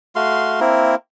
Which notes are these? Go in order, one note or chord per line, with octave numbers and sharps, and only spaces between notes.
A3 F#4 F5 C6
A#3 C4 E4 A#4